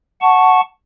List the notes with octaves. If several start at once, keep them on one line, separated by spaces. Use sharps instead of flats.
F#5 A5 C#6